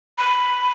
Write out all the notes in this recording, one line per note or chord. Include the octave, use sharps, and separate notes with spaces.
B5